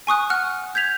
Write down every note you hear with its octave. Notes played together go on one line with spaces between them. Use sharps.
G#5 C#6 D#6 F#6
F#5 F6 F#6
G6 G#6 B6 F7